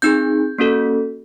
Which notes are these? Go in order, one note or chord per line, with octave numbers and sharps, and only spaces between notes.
C4 D#4 G#4 G6
A#3 C#4 F#4 A4